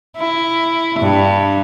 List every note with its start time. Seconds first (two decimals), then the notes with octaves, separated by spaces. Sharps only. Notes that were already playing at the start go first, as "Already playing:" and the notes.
0.17 E4
0.99 G2